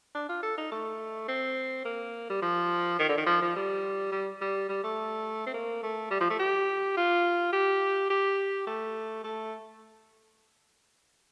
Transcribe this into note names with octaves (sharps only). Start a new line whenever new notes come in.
D4
F4
A4
D#4
A3
C4
A#3
G3
F3
D#3
D3
D#3
F3
F3
G3
G3
G3
G3
A3
C4
A#3
A3
G3
F3
A3
G4
F4
G4
G4
A3
A3